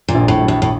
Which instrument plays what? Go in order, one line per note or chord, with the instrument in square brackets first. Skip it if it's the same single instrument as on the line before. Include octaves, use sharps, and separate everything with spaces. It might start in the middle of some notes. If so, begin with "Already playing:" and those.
[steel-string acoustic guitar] A#2
[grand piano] A#1
[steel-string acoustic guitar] A2
[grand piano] F#3
[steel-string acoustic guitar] A2
A2